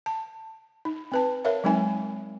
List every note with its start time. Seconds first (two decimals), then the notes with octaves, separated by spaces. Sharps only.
0.06 A5
0.85 D#4
1.12 C4 B4 A5
1.45 A#4 C#5 E5 F5
1.64 F#3 G#3 C4 D#4 G#5